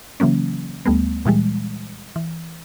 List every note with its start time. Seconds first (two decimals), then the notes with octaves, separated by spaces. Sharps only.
0.20 C#3 E3 F#3 A#3 C#4
0.85 D2 G3 A3 B3
1.25 A#2 E3 G3 G#3
2.16 E3